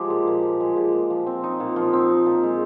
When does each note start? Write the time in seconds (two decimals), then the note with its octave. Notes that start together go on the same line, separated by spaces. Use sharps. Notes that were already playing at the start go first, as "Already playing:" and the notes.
Already playing: F3 G#3 G4
0.10 A#2
0.27 A#2
0.43 F3
0.61 G#3
0.76 A#2 G4
0.93 A#2
1.10 F3
1.27 C4
1.43 D#4
1.60 A#2
1.76 F3 F4
1.93 C4
2.09 D#4
2.26 A#2
2.43 G#3 F4